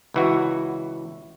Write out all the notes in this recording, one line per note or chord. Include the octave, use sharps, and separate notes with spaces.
C#2 E3 F#4